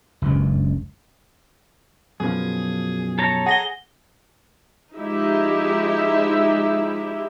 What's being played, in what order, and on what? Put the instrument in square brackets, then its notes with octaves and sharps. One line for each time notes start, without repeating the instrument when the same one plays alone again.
[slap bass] F#1 C#2 G2
[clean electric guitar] F#2 B2 F3 [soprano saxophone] G#4
[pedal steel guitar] A4 C#5 A#5
[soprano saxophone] G#4 [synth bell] F#5 A#6 G7
[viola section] F3 G#3 D#4 E4 G4 E5